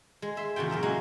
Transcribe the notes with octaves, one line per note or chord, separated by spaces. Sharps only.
G#3
E5 C6
E2 A#2 C#3 F#4 G5
F#2 A#4 E5 A#5
F#3 G#3 A#3 F#4 A#4 F5